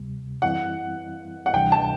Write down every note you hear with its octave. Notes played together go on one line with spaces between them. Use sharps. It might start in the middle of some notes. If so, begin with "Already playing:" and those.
Already playing: D2 C3 G3
F#2 E3 G3 C4 E4 F#5
F#5
D2 C3 E3 G3 D4 G5
A5